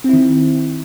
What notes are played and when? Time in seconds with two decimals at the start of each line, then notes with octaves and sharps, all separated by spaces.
0.04 C4
0.09 E4
0.13 D#3